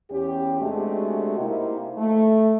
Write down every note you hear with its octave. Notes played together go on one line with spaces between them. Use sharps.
E2 C#4 G4
C3 G#3 A3 D4 F#4
C3 A#3 C4 D#4 E4
A3